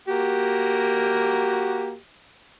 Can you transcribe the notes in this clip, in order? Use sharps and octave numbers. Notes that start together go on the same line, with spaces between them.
A#3 F#4 G4